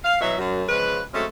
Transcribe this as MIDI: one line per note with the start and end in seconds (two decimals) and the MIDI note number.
0.05 0.19 77
0.21 0.35 47
0.21 0.35 52
0.21 0.35 54
0.21 0.35 76
0.39 0.63 42
0.69 1.00 49
0.69 1.00 53
0.69 1.00 56
0.69 1.00 71
1.14 1.26 54
1.14 1.26 56
1.14 1.26 57
1.14 1.26 60
1.14 1.26 61